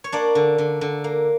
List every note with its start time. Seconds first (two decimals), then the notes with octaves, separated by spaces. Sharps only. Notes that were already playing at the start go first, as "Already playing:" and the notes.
0.04 C#5
0.12 A#3 D4 D5
0.35 D3
0.58 D3
0.81 D3
1.04 A#3